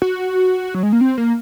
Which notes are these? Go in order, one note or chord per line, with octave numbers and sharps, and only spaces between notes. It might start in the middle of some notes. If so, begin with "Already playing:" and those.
F#4
F#3
G#3
A#3
C4
A#3